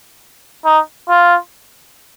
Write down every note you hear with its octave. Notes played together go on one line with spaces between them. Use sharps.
D#4
F4